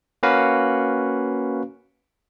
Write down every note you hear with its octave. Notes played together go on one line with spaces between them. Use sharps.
A#3 C#4 F#4 B4 F5